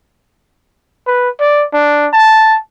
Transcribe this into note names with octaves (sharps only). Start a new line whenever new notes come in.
B4
D5
D4
A5